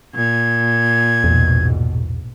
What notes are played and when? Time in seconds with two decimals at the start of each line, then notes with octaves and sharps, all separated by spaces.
0.15 A#2 G#6
1.24 A#1 E2 G#2 B2